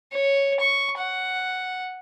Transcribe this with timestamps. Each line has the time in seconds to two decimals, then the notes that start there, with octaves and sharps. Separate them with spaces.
0.12 C#5
0.60 C#6
0.98 F#5